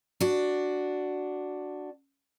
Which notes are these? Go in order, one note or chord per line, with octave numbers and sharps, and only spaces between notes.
D4 F#4